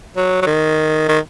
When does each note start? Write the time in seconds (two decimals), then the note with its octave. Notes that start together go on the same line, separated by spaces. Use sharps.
0.16 F#3
0.42 F#3
0.46 D#3
1.08 D#3